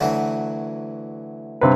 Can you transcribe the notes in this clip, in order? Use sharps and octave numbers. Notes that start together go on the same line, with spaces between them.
D2 E3 F#3
G2 C3 B4